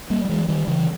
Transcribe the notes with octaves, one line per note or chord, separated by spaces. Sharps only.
G3 A#3
G3
E3 G#3
D#3 G3
C#3 E3